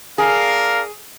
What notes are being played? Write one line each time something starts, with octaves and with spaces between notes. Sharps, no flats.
D4 G#4 A#4 F5